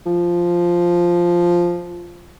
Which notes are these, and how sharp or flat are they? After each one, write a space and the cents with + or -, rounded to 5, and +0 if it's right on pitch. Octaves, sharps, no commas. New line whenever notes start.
F3 -5